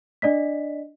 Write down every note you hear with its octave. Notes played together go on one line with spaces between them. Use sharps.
D4 D5 D#5 B6